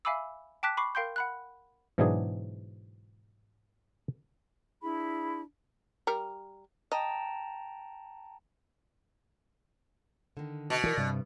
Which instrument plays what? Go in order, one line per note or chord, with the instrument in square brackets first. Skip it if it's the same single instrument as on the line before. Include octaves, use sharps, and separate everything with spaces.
[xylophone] E5 F5 G#5 B5 D6 E6
G5 A5 D6 F#6 B6
B5 C#6 D6 C7
A#4 F5 G5 C6 G6
F#5 B5 F#6
[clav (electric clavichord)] G#2 B2 E3 F#3 D4 G#4
[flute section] D4 E4 G#4 B5
[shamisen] G3 A#4
[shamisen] D#5 [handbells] G5 A5 A#5
[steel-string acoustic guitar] D3 D#3
[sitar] B2
[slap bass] E3 [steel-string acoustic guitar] A#4 D5
[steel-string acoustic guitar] G2 [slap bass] C3